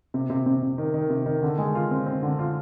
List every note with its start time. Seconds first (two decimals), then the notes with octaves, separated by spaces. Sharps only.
0.14 C3
0.30 C3
0.46 C3
0.62 C3
0.78 D#3
0.94 D#3
1.10 C3
1.26 D#3
1.43 D3
1.58 G#3
1.75 F4
1.91 C4
2.06 C4
2.23 D3
2.39 F4